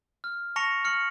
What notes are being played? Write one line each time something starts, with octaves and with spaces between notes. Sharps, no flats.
F6
A5 C#6 A#6 C#7 F7
F6 C#7 F#7